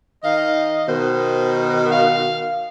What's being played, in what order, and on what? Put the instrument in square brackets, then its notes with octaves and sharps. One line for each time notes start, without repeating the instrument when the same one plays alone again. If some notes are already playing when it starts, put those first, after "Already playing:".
[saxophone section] D#3 F5 [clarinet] D#5
[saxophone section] B2 D#3 [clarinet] C5
[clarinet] F5